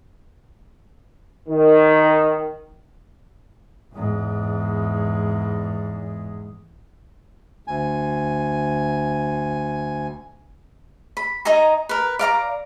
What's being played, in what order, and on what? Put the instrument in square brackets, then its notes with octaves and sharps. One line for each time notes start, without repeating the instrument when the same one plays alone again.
[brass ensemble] D#3
[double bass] E2 G#2
[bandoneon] D2 G#5
[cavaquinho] B5
D#4 D#5 G#5 A#5
A#4 B4
D5 F5 A#5 D6